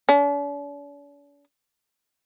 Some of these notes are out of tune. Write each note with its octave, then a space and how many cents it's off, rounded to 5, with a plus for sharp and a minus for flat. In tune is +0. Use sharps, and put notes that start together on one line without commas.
D4 -45